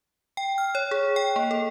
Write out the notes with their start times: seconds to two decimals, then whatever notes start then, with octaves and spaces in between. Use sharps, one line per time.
0.37 G5
0.58 F6
0.75 C#5
0.91 G#4
1.16 G5
1.36 A#3
1.51 A4